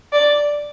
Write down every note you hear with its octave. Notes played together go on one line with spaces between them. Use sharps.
D5